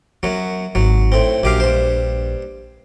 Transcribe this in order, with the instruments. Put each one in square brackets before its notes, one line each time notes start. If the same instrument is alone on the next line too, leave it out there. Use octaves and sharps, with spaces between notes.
[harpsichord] F#2 F#3 [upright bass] B3
[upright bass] G#1 [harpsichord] F#3
[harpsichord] A2 C4
[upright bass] A#1 [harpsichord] F#2 G4 F5
[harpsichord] G2 C5